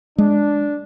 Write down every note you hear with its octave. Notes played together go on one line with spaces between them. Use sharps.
G#3 D4